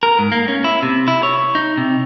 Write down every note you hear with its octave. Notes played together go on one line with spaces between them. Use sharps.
A#4
G#2
A#3
C#4
E4
C3
E4
C#5
D#4
C3